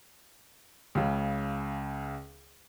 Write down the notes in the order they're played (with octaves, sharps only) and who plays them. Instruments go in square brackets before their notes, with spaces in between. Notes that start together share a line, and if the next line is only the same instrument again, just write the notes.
[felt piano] C#2 C#3